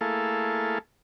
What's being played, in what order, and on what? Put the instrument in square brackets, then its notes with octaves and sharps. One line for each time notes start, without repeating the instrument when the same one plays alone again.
[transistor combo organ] A3 A#3 E4 G#4 A4 F5